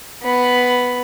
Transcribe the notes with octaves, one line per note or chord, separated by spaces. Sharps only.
B3 B5